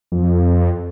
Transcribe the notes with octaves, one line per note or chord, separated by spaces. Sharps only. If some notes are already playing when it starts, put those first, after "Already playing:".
F2